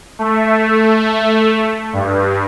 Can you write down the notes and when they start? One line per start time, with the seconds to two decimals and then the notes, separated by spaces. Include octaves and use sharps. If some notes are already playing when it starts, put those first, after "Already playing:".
0.19 A3
1.93 G2